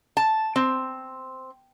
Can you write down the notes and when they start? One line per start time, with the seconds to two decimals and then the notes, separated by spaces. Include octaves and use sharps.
0.17 A5
0.56 C4